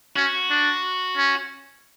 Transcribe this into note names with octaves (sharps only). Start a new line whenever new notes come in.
C#4 F#4
D4
C#4